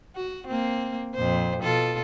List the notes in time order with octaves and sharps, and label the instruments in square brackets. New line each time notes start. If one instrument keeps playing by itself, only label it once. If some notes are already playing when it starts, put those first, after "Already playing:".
[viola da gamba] F#4
A#3 C4
F2 A#2 C5
B2 F4 A4